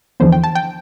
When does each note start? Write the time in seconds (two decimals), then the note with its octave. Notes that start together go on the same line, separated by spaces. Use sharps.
0.20 E2 D3 F3 B3 C5
0.32 G5
0.44 A5
0.55 G5